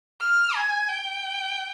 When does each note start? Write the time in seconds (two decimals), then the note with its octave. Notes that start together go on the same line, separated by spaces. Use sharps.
0.21 F6
0.55 G#5
0.89 G5